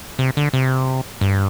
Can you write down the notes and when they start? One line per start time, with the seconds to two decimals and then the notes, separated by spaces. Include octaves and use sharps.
0.19 C3
0.37 D3
0.53 C3
1.21 G2